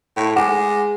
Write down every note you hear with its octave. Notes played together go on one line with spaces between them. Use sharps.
A2
G#3 F#5 D6